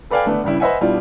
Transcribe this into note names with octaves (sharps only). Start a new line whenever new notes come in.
A4 B4 D5 F5 G5 G#5
D3 A3 B3 D4
G2 C#3 G3 E4
B4 C5 D#5 E5 F#5 G#5
B2 G3 D4 E4 F4